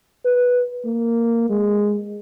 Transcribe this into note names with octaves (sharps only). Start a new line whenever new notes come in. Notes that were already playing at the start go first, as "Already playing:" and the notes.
B4
A#3
G#3